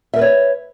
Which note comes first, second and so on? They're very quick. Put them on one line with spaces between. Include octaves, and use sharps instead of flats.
E5 A#4 B4 C#5